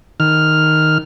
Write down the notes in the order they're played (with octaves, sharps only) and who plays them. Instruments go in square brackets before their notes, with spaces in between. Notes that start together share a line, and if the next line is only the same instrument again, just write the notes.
[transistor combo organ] D#3 F6